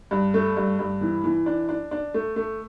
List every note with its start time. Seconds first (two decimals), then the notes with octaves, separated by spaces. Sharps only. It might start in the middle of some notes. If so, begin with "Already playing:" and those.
0.11 G2
0.34 A3
0.57 G2
0.79 G2
1.01 E3
1.24 E3
1.46 D4
1.69 D4
1.91 D4
2.14 A3
2.36 A3